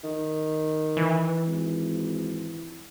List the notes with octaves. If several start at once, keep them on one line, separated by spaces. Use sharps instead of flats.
D#3
E3
G#1